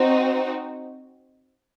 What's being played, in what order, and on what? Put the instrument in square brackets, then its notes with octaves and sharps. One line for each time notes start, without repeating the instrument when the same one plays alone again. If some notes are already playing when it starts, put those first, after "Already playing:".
Already playing: [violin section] C4 D#4 F#4